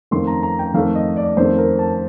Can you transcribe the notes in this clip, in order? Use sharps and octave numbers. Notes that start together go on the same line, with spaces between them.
F2 D#3 A3 C6
A#5
A#5
G5
F2 D#3 A3 F5
D#5
D5
F2 D#3 A3 C5
A#4
A5